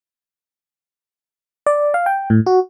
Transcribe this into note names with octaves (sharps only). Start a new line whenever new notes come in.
D5
F5
G5
A2
F#4